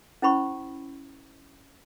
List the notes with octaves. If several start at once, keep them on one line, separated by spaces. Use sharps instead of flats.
C#4 E4 C5 B5 C#6